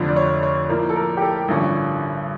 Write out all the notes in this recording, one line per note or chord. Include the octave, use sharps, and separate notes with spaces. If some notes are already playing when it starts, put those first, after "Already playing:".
Already playing: F1 F2 D3 F3
D5
C#5
C#5
A2 F3 A#3
A4
A#4
G4
A4
A1 G2 D3 F3 C#4